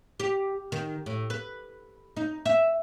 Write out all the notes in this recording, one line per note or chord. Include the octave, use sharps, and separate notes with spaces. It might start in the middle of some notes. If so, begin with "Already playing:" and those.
G4
D#3
A2
B4
D#4
E5